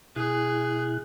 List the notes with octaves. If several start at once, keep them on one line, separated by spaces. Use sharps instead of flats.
B2 E4 G#4 F#6